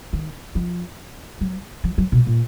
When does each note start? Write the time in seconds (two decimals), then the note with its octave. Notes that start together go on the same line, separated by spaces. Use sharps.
0.13 D#3
0.55 F3
1.41 F#3
1.84 F3
1.98 F#3
2.12 B2
2.27 A#2